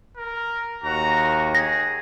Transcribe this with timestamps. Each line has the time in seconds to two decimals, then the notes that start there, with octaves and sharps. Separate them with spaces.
0.17 A#4
0.84 D#2 F#4 A#5
1.55 G#4 A#6